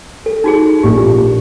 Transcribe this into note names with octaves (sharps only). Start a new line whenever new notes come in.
A4
D#4 F#4 G#4
A#1 A#2 G4